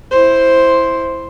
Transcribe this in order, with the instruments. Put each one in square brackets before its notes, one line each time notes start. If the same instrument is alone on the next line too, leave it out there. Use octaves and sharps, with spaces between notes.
[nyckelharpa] E4 C5